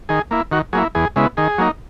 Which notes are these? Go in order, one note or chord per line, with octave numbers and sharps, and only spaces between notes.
D#3 G#4
A#3 E4
D#3 F#4
F#3 A#3 E4 G#4
E2 G#4
C#3 G#3 B3 E4
D#3 G#4
F#3 A#3 D#4